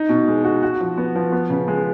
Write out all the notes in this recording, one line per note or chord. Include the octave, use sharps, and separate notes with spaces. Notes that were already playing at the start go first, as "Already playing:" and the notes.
Already playing: D#4
B2
G#3
F#4
F#4
F3
B3
F3
B3
C#3
G#3